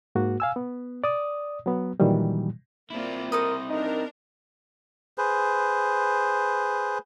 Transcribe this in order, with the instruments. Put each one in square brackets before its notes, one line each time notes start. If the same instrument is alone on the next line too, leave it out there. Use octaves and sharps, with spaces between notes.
[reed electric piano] G#2 A#3 F#4
F5 G#5 E6
B3
D5 D#6
F#3 B3
A#2 D#3 E3 F#3 G3
[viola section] A#3 F4 D5 [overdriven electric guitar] C4 E4
[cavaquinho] A4 C5 D#6 [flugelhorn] A#4 [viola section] D#5
[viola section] D4 A#4 [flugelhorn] D#4
[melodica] G#4 B4 C5